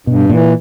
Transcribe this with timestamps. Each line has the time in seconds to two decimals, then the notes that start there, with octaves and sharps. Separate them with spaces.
0.07 G2 B2
0.30 A#2 E3